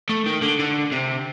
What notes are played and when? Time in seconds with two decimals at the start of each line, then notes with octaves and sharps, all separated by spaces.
0.09 A3
0.26 D#3
0.42 D3
0.59 D3
0.92 C3